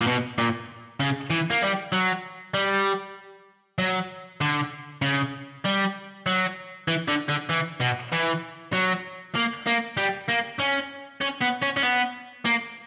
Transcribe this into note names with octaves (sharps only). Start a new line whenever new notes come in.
A#2
B2
A#2
C#3
E3
A#3
G3
F#3
G3
F#3
D3
C#3
G3
F#3
E3
D3
D3
E3
B2
E3
F#3
A#3
A#3
G3
A#3
C#4
C#4
B3
C#4
C#4
B3
A#3